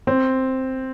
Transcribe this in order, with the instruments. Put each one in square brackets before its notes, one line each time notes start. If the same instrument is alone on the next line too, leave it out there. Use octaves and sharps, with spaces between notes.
[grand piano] C4